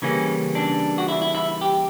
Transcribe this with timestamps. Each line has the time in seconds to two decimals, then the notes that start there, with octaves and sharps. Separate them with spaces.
0.02 C#3 E3 G3 A#3 C#4
0.55 D4
0.98 F#4
1.08 E4
1.22 E4
1.35 E4
1.61 G4